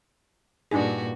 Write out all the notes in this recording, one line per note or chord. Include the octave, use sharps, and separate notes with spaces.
G2 A#2 D4 D#4 F#4 G#4